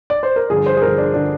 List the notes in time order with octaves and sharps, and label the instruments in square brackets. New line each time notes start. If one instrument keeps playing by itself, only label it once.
[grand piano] D5
C5
A#4
G2 D3 F3 G#4
C5
G#4
G2 D3 F3 A#4
D4
D3 F3 D4